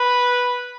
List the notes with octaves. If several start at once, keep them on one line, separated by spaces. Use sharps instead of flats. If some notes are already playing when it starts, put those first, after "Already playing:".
Already playing: B4